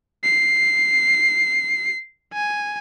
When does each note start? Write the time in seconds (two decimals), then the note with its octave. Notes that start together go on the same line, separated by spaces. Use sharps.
0.24 C7
2.33 G#5